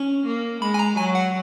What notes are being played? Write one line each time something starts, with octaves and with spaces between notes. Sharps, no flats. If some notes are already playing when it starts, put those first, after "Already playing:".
Already playing: C#4 C#6
A#3
G#3 B5
G#5
A#5
F#3 G#5
F#5